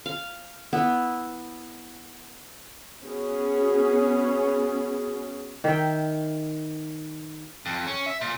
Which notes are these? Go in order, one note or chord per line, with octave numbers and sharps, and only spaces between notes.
F5
B3 E4
B3 C#4 F#4 G#4
D#3 E5 G5
F2
C#4
E5
A#2